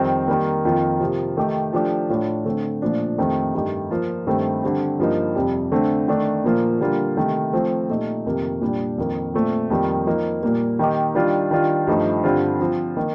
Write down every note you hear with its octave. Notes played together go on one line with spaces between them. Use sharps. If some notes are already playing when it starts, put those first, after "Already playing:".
Already playing: F2 D#3 G3 C4
D#3 G3 A#3
F2 D#3 A#3 F4
C3 F3 A#3
D#3 A3 D#4 G4
F3 A3 D4 G4
A2 A3 D4 F4
D3 A3 C4
A#2 F3 A3 D4
F2 D#3 A3 C4 G4
G2 D#3 A3 D#4 G4
F3 A#3 F4
G2 D#3 A3 C4
D3 G3 C4
G2 F3 A#3 D#4
F2 C3 G3
D3 A3 C4
D#3 A3 D4
A#2 F3 A#3 F4
D3 G3 A#3 F4
C3 D#3 A3
F3 A3 C4
A#2 A3 D#4 G4
F2 C3 D#3 A#3
A#2 G3 D4
F2 D#3 A#3
A#2 A3 C4
F2 D#3 G3 A#3
F3 A#3 D#4
A#2 G3 A#3
D#3 A#3 D#4 G4
D#3 G3 D4 F4
D#3 G3 D4 F4
G2 F3 A3 D#4 G4
G2 D3 G3 C4 F4
F3 C4 F4
D#3 A#3 D#4